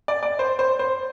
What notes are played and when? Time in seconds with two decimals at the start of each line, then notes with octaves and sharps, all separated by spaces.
0.08 D5
0.23 D5
0.39 C5
0.59 C5
0.79 C5